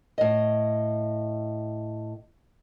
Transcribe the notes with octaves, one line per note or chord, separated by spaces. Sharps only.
A2 D#5